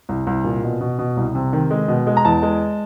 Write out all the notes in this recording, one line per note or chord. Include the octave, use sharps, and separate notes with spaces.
C2
C2
A#2
B2
B2
B2
C2
C3
D#3
G#3
B2
G#3
A#5
E2 A5
G#3